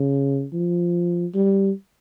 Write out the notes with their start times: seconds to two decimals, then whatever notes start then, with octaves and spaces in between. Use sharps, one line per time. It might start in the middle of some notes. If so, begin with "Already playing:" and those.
Already playing: C#3
0.53 F3
1.34 G3